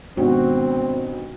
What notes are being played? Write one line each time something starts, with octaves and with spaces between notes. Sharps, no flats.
G#1 G2 B2 C4 F#4